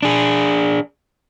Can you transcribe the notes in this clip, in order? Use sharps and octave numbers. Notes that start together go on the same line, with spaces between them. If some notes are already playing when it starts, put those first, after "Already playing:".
D4 G#4